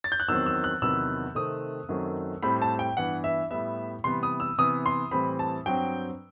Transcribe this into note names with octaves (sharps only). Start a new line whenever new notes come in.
A6
G6
F#6
E2 D#3 F#3 C4 E6
E6
F#6
E2 C3 D#3 F#3 B3 E6
C3 D#3 A3 C4 D#6
F#2 D#3 F#3 A3 C4
A2 G3 C4 B5
A5
G5
G2 E3 B3 F#5
E5
A2 G3 B3 E5
C3 E3 G3 B3 C6
D#6
E6
C3 E3 B3 D#6
C6
A2 E3 G3 C4 B5
A5
G2 F#3 C4 G5